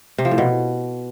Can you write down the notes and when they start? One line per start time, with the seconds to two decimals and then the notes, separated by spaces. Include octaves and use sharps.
0.18 C3
0.25 F3
0.31 A2
0.38 B2